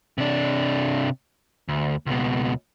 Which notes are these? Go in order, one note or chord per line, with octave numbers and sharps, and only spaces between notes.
C3 D4
D2
C#2 B2